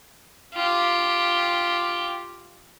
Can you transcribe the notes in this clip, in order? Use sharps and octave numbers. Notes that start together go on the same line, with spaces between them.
F4 G4